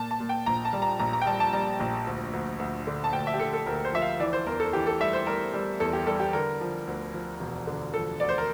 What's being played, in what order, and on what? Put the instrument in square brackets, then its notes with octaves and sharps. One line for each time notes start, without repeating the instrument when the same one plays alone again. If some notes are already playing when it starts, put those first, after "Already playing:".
Already playing: [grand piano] A#2 A5
A5
A#2
G5
A#1 A#5
A5
G3
A#5
A#1 A#5
A#5
G5
G3 A5
A5
G3 A#5
A#1
D2
D2
D2
D3
A5
D2 G5
E5
G4
D3 A4
A4
D2 A#4
C5
F3 E5
F5
E3 D5
C5
E2 A#4
A4
E3 G4
A4
G3 E5
C5
G3 A#4
G3
E2 A4
G4
G3 A4
G4
D3 A#4
F3
D2
F3
E1
D3
F3 A4
D2 D5
C5
A#4